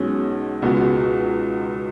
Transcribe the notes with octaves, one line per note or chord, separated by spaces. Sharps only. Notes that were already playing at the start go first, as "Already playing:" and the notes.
Already playing: B1 B2 G#3 C#4
C#2 B2 G#3 B3 F#4